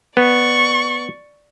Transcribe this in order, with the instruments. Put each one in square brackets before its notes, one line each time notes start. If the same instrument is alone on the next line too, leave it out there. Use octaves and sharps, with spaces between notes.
[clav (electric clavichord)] B3 [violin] D5 C#6